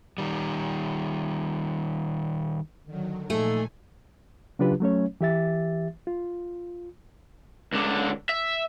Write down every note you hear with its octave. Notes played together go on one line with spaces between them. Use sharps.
D#3 G3
D3 D#3 F#3
A#2 F3 A3 D#4 G#4 A4 G#5
C#3 F#3 D4 F4 G4 B4
F#3 A3 C#4 C#5
E3 G4 E5 A6
F4
C#2 D3
E5